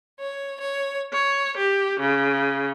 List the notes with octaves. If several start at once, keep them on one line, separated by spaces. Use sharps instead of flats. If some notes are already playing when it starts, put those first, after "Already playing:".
C#5
C#5
C#5
G4
C#3